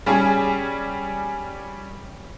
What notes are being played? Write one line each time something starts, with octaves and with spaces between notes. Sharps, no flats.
G3 C#4 G#4